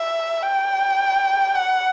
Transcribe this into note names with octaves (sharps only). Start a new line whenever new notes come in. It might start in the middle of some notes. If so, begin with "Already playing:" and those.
Already playing: E5
G5
F#5